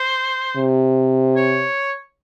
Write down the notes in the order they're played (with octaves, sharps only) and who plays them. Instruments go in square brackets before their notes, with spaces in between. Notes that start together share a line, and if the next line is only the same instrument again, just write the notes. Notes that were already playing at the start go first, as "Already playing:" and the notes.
Already playing: [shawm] C5
[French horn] C3
[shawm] C#5